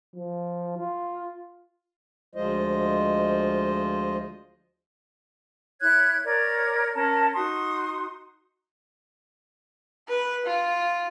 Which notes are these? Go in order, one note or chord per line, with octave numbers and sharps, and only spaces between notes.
F3
F4
D2 F3 G#3 F4 C5 D#5
E4 C#5 F#6 G#6
A#4 C#5 D5 G#6
C#4 A#4 A5
D#4 F#4 C6 D#6
B4
F4